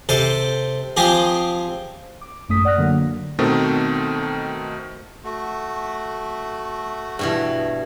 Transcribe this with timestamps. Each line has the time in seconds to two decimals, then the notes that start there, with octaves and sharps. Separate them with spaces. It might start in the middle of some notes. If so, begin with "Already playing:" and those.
0.09 C3 A4 C5
0.97 F3 C4 G4 G#4
2.21 D6
2.49 A1 F#2 A3 D#6 B6
2.65 D5 F#5 D#6 F6 F#6 A#6
2.78 D3 F#3 A#3
3.39 B2 D#3 A3 C4
5.24 A3 F#4
7.19 G2 B2 E3